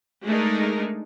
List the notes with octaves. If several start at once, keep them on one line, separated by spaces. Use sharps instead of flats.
G#3 A3 D4 D#4 A#4